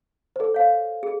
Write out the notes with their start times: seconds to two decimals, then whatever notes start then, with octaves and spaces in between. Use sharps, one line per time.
0.36 A4 C5
0.54 C#5 F5
1.03 G#4